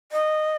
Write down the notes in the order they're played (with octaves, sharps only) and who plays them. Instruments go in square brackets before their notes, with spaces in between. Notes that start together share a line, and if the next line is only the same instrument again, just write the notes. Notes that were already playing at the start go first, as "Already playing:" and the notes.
[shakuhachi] D#5